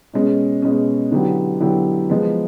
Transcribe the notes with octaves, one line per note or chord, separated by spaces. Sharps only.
B2 G#3 C#4
B2 G#3 C#4
D3 F#3 B3 E4 G4
D3 F#3 B3 E4 G4
F3 G#3 B3